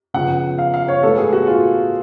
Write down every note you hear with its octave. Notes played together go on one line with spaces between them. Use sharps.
C#3 F3 B3 F#5
F5
F5
C#5
A2 G#3 B3 A4
G#4
F#4
F4